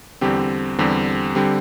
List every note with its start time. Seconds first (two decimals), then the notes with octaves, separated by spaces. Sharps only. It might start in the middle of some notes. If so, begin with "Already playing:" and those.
0.21 E2 D3 G3 C4 G4
0.78 E2 D3 G3 C4 G4
1.35 D3 G3 C4 G4